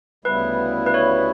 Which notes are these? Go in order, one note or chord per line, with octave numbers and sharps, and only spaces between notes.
D2 C#3 G3 B3 E4 B4
B4
C#5